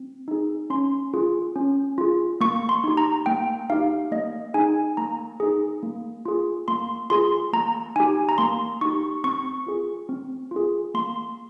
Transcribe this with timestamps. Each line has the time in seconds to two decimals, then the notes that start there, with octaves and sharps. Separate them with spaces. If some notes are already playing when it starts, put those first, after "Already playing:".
Already playing: C4
0.28 D#4 G#4
0.70 C#4 C6
1.14 F4 G#4
1.56 C#4
1.98 F4 G#4
2.41 A#3 C#6
2.69 C6
2.84 D#4 G4
2.97 A#5
3.26 A#3 G5
3.70 D#4 G4 F5
4.11 A#3 D#5
4.54 D#4 G#4 G#5
4.97 A#3 A#5
5.40 D#4 G#4
5.83 A#3
6.25 F4 G#4
6.68 A#3 C6
7.10 F4 G#4 C6
7.53 A#3 A#5
7.96 D#4 G4 G#5
8.29 A#5
8.38 A#3 C6
8.81 D#4 G4 C#6
9.24 C4 C#6
9.67 F4 G#4
10.09 C4
10.51 F4 G#4
10.94 A#3 C6